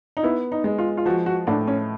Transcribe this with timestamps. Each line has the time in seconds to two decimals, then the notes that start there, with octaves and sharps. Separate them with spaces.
0.17 D#4
0.23 B3 E4
0.52 D#4
0.64 G#3
0.78 F4
0.97 F4
1.06 F3 F#4
1.26 F#4
1.47 A2 D4
1.67 C#4